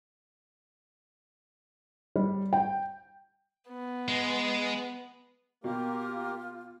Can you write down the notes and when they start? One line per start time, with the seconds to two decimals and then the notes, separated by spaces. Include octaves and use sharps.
2.16 G3
2.53 G5
3.69 B3
4.08 G#3
5.64 B2 A#3 F4 G4 A#4